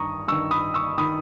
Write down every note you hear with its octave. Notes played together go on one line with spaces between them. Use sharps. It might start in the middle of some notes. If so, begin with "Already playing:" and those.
Already playing: G2 D#3 A#5 C#6 D#6
G2 D#3 C#6 E6
B5 D#6
C#6 E6
D#3 B5 D#6